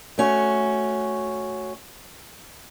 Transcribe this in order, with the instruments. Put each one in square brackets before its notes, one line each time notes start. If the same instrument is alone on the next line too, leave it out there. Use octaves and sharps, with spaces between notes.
[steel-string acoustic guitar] A3 C#4 F#4